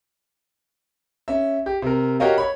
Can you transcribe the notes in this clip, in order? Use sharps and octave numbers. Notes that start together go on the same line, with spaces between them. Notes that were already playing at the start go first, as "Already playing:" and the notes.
C#4 E5
G4
C3 A#4
F#4 G4 A#4 C#5 D#5 F5
C#5 B5